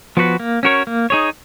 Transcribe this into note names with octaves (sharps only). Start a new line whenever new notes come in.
F3 B3 F#4 B4
A#3
C#4 F#4 A#4 C#5
A#3
D#4 G#4 C#5